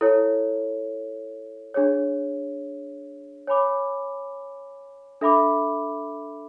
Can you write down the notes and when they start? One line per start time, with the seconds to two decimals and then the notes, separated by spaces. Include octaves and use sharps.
0.01 E4 A4 C#5
1.74 D4 G#4 C#5
3.47 C#5 G#5 B5 D6
5.21 D4 A4 E5 B5 D6